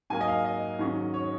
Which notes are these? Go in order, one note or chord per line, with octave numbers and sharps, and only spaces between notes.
G#2 F#3 A#3 G#5
D#5
F5
D#5
G#2 D#3 F#3 C#4
C#5